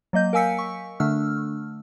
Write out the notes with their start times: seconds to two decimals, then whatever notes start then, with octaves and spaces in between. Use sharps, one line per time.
0.13 F#3 A#3 D#5 G6
0.33 A#4 F5 G#5 E6 B6 C#7
0.58 C#6
1.00 D3 A3 D4 E6 F6